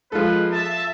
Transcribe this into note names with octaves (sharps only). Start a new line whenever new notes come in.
F3 G#3 F4 A4 B4
E5 A5